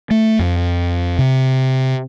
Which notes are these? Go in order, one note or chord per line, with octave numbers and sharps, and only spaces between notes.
A3
F2
C3